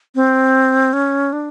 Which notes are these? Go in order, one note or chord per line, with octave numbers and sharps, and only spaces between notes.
C4
C#4
D4